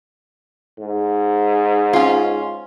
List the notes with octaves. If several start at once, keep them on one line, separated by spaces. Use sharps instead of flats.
G#2
C#4 F4